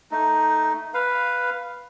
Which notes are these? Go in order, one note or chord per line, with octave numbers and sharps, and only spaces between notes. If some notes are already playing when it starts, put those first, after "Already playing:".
A3 D#4
B4 F5